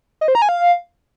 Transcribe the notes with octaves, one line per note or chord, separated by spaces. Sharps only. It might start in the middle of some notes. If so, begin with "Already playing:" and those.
D#5
C5
A#5
G#5
F5